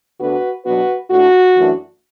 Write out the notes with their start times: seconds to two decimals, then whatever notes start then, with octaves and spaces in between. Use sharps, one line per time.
0.19 D2 D3 B3 D4 F#4 B4
0.65 B2 F#3 B3 D4 F#4 B4
1.10 A2 A3 D4 F#4
1.56 F#2 E3 A3 D4